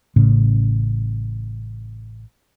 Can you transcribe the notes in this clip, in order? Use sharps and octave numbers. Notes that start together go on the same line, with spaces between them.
A1 A2 C#3